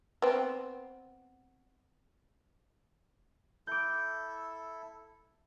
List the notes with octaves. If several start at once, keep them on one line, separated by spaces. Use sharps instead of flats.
B3 C4
E4 A4 D6 G6